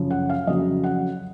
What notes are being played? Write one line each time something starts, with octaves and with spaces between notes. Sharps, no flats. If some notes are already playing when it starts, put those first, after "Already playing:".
Already playing: F#2 C#3 F3
F#5
F5
F2 C#3 F#3 D#5
F#5